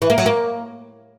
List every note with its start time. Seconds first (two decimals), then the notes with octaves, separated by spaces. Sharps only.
0.02 E3
0.10 A#3
0.18 F#3
0.26 A#3